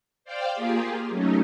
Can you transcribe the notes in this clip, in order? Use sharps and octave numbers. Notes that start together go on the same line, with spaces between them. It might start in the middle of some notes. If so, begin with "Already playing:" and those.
C5 D5 F5 G5
A#3 F4 G4 G#4
F#3 A3 C#4 D#4